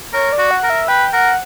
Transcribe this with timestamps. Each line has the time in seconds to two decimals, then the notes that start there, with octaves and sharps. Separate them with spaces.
0.13 A#4 C#5
0.33 D5
0.38 F#4
0.51 F#5
0.64 A#4
0.70 E5
0.88 B4 G5
1.13 A#4 F#5